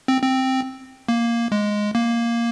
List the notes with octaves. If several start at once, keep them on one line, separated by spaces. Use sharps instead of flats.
C4
C4
A#3
G#3
A#3